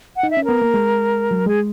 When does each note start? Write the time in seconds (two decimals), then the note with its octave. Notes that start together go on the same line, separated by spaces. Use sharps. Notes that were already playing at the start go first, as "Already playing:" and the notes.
0.16 F#5
0.23 D#4
0.31 E5
0.37 C#4
0.45 B3 A#4
0.62 A#3
0.74 G#3
1.31 F#3
1.46 G#3 G#4